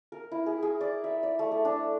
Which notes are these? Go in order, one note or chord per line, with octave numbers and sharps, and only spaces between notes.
A#4
E4
G#4
G#4
D5
E5
D5
A3
A4
D4